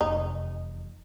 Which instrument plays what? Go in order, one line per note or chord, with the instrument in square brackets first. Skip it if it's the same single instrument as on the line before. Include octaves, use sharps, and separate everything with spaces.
[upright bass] F1 E2 [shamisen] D#4